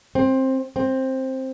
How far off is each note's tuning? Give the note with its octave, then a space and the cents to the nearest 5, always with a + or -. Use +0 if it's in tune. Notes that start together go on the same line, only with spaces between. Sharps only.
C4 +15
C4 +10